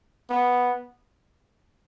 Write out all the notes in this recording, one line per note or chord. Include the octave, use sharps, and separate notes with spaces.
B3